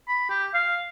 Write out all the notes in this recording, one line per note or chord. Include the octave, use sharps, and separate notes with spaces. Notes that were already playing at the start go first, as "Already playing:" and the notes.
B5
G4
F5